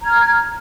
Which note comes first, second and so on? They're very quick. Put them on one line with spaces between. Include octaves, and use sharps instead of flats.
A#5 G#6 F6